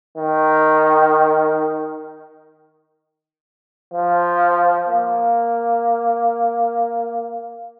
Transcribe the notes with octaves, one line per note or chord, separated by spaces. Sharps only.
D#3
F3
A#3